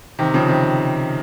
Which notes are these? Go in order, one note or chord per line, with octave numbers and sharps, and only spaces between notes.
C3 D#3
C#3 F3
C3 D#3